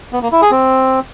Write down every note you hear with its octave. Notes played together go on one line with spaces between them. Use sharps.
B3
A#3
E4
G#4
C4